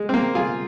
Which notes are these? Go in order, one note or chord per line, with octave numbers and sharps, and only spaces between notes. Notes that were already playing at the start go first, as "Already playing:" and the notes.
Already playing: G#3
C4
A#3
F4 G#4